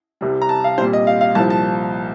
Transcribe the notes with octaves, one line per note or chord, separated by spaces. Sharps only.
C2 C3 G3
A#5
A5
F5
A#2 G3 C4 C5
D#5
F5
F5
C2 A#2 F3 A5
A5